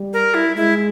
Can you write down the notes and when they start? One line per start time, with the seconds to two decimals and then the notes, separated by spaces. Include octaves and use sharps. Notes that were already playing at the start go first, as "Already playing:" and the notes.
Already playing: G3
0.13 A#4
0.34 E4
0.56 G#3 E4